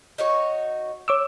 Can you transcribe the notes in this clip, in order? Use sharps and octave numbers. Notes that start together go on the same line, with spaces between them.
D#4 F#4 C#5
C#5 D6 E6